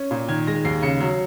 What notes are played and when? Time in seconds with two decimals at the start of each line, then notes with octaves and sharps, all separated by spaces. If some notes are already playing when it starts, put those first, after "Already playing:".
Already playing: C#4
0.11 A#2
0.28 D#3 G#6
0.47 G#3 A#6
0.65 D#2 C7
0.82 C#3 C#7
1.01 F#3